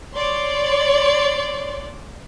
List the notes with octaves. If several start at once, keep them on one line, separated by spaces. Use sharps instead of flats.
C#5 D5 C6